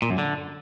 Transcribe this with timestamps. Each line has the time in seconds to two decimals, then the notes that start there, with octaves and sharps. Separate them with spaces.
0.02 A#2
0.10 F#2
0.18 D3